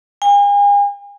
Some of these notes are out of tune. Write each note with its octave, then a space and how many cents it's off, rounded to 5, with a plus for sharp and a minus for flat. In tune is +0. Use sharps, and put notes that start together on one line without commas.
G#5 -40